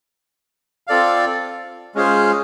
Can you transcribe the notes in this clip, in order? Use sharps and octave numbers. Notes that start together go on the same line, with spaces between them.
C4 F4 A4 D5 F5
G#3 C#4 F4 G#4 C5